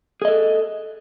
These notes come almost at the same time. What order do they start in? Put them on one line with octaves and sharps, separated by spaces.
G#4 D#5 A4